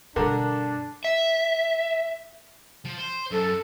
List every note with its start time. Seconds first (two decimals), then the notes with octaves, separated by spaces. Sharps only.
0.16 G2 B2 D3 D4 A#4
1.04 E5
2.85 F3
2.99 C5
3.32 F#2 A4